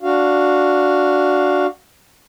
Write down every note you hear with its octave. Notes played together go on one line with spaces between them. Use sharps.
D4 F#4 F5